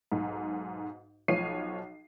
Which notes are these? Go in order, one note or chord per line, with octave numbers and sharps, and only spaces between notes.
B1 G#2
B1 F3 C#5 C7 D#7